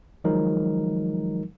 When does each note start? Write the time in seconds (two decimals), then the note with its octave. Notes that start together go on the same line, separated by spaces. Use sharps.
0.24 D#3 F3 F#3 G#3 D#4 A#4